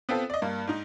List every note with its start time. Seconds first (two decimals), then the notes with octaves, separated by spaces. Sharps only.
0.09 B3 C4 F4 A4
0.30 D5 D#5
0.42 G2 A#3
0.67 G#2 D#4